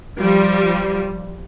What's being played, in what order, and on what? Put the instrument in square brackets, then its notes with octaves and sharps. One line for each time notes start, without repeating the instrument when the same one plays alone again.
[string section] F3 G3